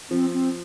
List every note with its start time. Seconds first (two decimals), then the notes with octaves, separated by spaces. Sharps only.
0.10 F3 C4
0.33 C4